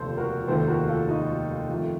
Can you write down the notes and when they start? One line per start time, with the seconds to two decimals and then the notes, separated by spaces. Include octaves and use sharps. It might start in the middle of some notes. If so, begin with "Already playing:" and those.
Already playing: F1 D#2 C#3 A4 C5
0.17 F#4 A#4
0.48 F1 D#2 D#3 A3 A4 C5
0.68 F#4 A#4
0.88 F4 A4
1.08 D#4 F#4
1.69 F2 D#3 A3